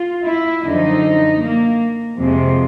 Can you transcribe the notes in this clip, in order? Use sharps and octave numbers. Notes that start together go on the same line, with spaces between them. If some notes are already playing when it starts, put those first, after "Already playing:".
Already playing: F4
E4
F#2 D3 F3 D#4
A#3
F2 C3 F3 G#3